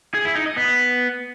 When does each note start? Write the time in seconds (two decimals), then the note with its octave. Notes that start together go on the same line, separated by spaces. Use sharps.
0.14 G#4
0.25 E4
0.35 D#4
0.46 D#5
0.56 B3